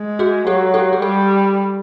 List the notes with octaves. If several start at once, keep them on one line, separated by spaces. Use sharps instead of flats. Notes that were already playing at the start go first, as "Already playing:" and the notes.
Already playing: G#3
F#4 G#4
F#3 G4 A4
G4 A4
G#4
G3 G4 A4